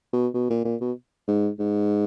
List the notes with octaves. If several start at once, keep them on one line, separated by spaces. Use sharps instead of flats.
B2
B2
A#2
A#2
B2
G#2
G#2